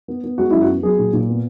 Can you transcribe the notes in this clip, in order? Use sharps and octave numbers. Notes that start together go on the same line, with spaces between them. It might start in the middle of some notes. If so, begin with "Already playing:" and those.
B3
B3
G#3 F#4
F#2 E4
F#4
B3
F#3 G#4
A#2
A#2
B3